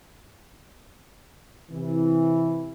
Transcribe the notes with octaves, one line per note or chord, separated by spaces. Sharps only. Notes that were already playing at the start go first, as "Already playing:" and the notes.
C3 E3